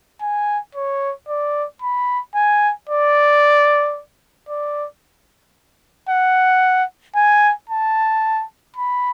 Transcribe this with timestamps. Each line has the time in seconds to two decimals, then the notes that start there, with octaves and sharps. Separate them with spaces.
0.21 G#5
0.75 C#5
1.28 D5
1.82 B5
2.35 G#5
2.89 D5
4.49 D5
6.09 F#5
7.16 G#5
7.69 A5
8.76 B5